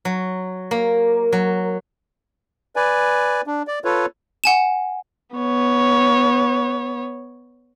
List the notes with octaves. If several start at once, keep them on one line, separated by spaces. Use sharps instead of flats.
F#3
A#3
F#3
B4 D5 G#5
D4
D5
F4 A4 B4 C#5
F#5 G#5 E7
B3 C#5